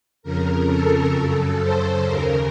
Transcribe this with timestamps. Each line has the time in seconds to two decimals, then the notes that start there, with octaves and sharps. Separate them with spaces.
0.23 F2 C#3 A#4
0.69 A4
1.14 F#2 C#3 A4
1.60 C5
2.06 D#2 C#3 A#4